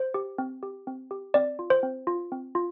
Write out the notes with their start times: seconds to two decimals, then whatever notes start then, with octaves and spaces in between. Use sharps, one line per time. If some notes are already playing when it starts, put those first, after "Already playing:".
Already playing: C5
0.14 G4
0.38 C4
0.63 G4
0.87 C4
1.11 G4
1.34 C4 D5
1.59 F4
1.70 C5
1.83 C4
2.07 F4
2.32 C4
2.55 F4